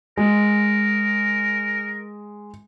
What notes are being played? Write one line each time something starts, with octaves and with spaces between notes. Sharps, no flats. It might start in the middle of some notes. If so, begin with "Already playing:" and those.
G#3 A#4